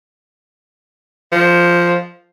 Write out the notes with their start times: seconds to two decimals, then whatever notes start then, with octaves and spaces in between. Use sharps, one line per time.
1.32 F3